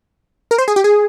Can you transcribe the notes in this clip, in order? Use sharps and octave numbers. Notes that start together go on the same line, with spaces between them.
A#4
C5
G#4
G4
G#4